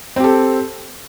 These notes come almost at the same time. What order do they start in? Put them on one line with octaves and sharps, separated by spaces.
C4 G4 A4